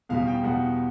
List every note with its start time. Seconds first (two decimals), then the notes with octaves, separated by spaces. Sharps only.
0.09 E2 B2 G3 F5
0.27 G5
0.44 E2 B2 G3 F#5